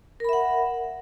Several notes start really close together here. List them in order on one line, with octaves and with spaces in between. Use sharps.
A#4 B5 E5 F#5